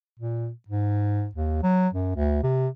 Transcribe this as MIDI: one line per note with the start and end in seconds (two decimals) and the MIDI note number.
0.19 0.50 46
0.68 1.27 44
1.35 1.59 39
1.63 1.88 54
1.93 2.14 42
2.16 2.42 38
2.43 2.68 48